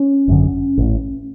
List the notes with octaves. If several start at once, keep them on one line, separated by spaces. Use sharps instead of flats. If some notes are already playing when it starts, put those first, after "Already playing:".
Already playing: C#4
G#1 F#2 D3
A1 A2